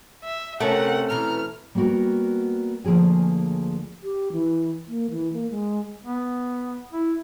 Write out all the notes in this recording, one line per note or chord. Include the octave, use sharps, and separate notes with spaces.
E5
C3 A3 C#4 A#4 F#5
B2 E3 A#5 F6
G3 A#3 B3 F#4 A#4
D2 F3 A#3 G#4 G#5
G4
E3
A#3
E3
A#3
G#3
B3
E4